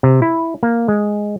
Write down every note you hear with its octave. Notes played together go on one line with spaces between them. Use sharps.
C3
E4
A#3
G#3